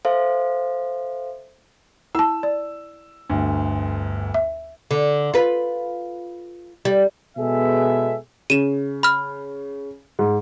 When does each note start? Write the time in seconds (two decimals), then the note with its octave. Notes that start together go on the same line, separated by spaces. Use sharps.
0.05 A4 C5 E5 F5
2.15 E4 A5 E6
2.43 D5
3.30 G1 D2
4.34 E5
4.91 D3
5.34 F4 B4
6.85 G3
7.38 B2 G#3 B3 G#4 A4 E5
8.50 C#3 D#7 E7
9.03 B5 F6
10.19 G#2